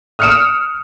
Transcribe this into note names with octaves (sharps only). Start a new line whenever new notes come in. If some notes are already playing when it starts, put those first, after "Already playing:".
D#6 F6 F#6 C#7 D7 E7